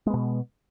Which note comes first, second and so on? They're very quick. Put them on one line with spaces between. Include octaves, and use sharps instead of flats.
G#3 B3 B2